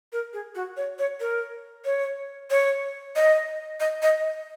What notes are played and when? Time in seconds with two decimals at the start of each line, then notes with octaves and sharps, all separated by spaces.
0.13 A#4
0.33 G#4
0.55 F#4
0.77 C#5
0.99 C#5
1.20 A#4
1.85 C#5
2.50 C#5
3.16 D#5
3.80 D#5
4.03 D#5